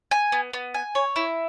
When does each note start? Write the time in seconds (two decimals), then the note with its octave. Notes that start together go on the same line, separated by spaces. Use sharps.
0.11 G#5
0.32 B3
0.53 B3
0.74 G#5
0.95 C#5
1.16 E4